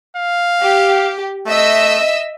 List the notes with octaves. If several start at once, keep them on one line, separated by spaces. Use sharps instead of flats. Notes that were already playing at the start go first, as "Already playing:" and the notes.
F5
G4
A3 D#5 E5 E6